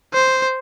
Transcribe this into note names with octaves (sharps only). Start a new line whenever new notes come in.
C5